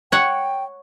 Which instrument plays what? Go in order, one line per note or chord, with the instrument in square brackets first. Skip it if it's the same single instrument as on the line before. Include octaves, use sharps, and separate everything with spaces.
[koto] C#5 F#5 [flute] G5